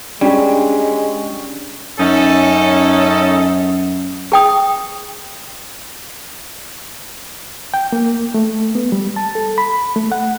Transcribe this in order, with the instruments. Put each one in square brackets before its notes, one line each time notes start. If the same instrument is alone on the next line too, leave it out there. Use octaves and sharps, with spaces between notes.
[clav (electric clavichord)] G3 [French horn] G#3 [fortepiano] C#4 G4 [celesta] D4
[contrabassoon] F#2 [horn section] C#4 D#4 A4
[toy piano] G#4 G5 D#6
[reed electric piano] G5
A#3
A3
B3
G3
A5
A4
B5
A3
F#5